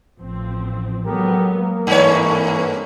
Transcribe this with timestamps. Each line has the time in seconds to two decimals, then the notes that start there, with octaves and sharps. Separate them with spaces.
0.19 A1 F3 C4
1.05 F#3 G#3 B3 G4 A4 A#4
1.55 A#3 A#4
1.87 G2 E3 C4 A4 C#5